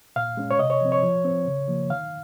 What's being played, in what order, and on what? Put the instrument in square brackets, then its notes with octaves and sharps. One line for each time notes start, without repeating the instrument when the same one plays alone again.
[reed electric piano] A#2 F5
G#3 C#4
C#5
C3 D#5
C#5
F3 C4
C#5
F3
C4
C#3
F3 A#3
D#3 F5